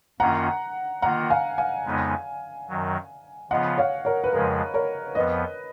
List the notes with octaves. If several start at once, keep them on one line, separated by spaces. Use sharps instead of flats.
F#2 D#3 A#3 C#4 F4 F#5 A#5
D#3 A#3 F4 F#5 A#5
F5 G#5
F5 G#5
F2 C#3 G#3 B3 D#4
F#2 D#3 F#3
C#3 F3 B3 F4 D#5 F#5
C#5 F5
A#4 C#5
B4
F2 C#3 F3 G#3 A#4
A#4 C#5
F2 F3 B3 B4 D#5